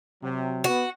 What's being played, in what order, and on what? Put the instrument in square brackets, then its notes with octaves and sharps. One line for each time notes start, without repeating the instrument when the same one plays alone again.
[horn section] C3 F#3
[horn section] B3 [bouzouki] F#4